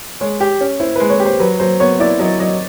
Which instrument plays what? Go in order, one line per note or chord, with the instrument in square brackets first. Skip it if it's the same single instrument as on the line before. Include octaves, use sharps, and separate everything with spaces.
[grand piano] G#3 [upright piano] C#5
[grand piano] G4
C#4
[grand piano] E4 [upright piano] C5
[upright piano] B4
[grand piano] G#3
[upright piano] C#5
[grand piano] G4
[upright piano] C5
[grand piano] F#3 [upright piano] B4
[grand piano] F#3 [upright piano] C5
[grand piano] B3 [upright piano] C#5
[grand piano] E4 [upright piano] D5
[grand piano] F#3 [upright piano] D#5
[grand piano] F#3 [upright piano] D#5